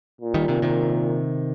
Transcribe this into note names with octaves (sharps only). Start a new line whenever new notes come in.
A#2
D#3 G3
C3 D#3
C3 D#3